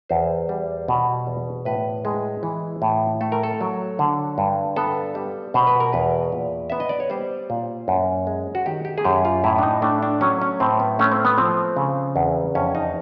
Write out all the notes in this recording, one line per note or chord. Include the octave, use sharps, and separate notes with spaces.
E2 C5
G3
B2
E2
A2 B4
G#3
E3
A2
A3 A4
A#4
A4
F#3
D3
G2
B3 A4
G3
B2 C5
B4
A#4
E2 B4
A#2
B3 E5
D#5
D5
C#5
G3 C5
A#2
F#2
G#3
F#4
D#3 G4
G4
G#4
F#2 G4
F4
A2 E4
D4
D#4
A3 D4
D4
F#3 C#4
C#4
A2 C4
B3
A3 C#4
C4
B3
F3 C4
C#3
E2
F2 C#4
D#4